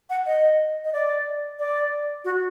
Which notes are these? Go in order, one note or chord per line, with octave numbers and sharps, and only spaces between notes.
F#5
D#5
D#5
D5
D5
F#4